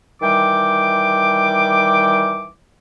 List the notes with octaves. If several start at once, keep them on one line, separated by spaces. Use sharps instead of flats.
D#3 E3 G3 G5 D6